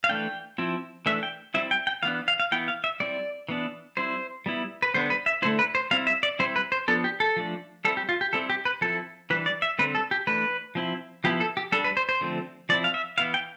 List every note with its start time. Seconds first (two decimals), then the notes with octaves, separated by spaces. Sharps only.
0.04 F5
0.09 E3 A3 D4 G5
0.58 F3 C4 E4
1.06 E3 A3 D4 E5
1.23 G5
1.54 G3 C4 E4 E5
1.71 G5
1.87 G5
2.03 E3 B3 D4 F5
2.28 F5
2.40 F5
2.52 E3 B3 E4 G5
2.68 F5
2.84 E5
3.00 G3 C4 E4 D5
3.49 E3 B3 D4
3.97 G3 C4 E4 C5
4.46 G3 B3 E4
4.82 B4
4.94 D3 G3 B3 D4 C5
5.10 B4
5.26 E5
5.42 D3 A3 C4 E4 C5
5.59 B4
5.75 C5
5.91 G3 C4 E4 F5
6.07 E5
6.23 D5
6.39 G3 C4 E4 C5
6.56 B4
6.72 C5
6.88 F3 B3 D4 A4
7.04 G4
7.20 A4
7.36 F3 A3 D4
7.85 G3 C4 E4 A4
7.97 G4
8.09 F4
8.21 G4
8.33 G3 C4 E4 A4
8.50 G4
8.65 B4
8.81 F3 C4 E4 A4
9.30 E3 G3 D4 B4
9.46 D5
9.62 E5
9.79 D3 G3 C4 B4
9.95 A4
10.11 G4
10.27 E3 A3 D4 B4
10.75 F3 C4 E4
11.24 F3 B3 E4 G4
11.40 A4
11.57 G4
11.72 G3 D4 A4
11.84 B4
11.97 C5
12.09 C5
12.21 D3 F3 A3 C4
12.69 F3 C4 E4 D5
12.84 F5
12.94 E5
13.18 E3 B3 E4 F5
13.34 G5